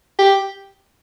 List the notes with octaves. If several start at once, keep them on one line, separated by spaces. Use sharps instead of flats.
G4